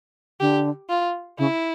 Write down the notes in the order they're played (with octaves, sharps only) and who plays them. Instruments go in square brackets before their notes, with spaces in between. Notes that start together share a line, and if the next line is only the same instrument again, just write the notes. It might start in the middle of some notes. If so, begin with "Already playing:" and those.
[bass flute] D3 [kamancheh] G4
[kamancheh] F4
[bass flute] C#3 [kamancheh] E4